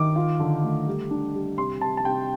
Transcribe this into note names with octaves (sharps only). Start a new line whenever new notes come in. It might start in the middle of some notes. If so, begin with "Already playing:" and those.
Already playing: D#3 D6
F4
D3
A3
G3
D4
G3
C3 C6
C3 A5
A5
C3 G5